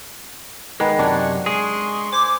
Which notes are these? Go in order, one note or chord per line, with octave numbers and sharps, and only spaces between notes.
D#3 G#3 B3 B4
F#2 C3 D4 F#5 G#5 C#6
G#3 G#4 C6 C#6
C5 G#5 D6